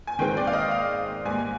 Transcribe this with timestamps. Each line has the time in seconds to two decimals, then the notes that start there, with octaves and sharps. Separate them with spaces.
0.07 G#5
0.19 G#2 D#3 G#3 C4 G5
0.37 D5
0.47 F5
0.53 D#5
0.71 F5
1.25 G#2 G3 A#3 G#5